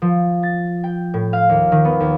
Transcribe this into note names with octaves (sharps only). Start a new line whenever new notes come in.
F3
A6
G5
A2
F5
D#2
D#3
B3
D#2